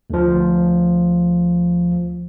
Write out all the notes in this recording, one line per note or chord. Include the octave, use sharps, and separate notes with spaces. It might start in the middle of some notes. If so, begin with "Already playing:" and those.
D2 F3